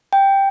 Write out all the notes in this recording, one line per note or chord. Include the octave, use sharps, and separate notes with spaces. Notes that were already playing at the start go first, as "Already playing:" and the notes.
G5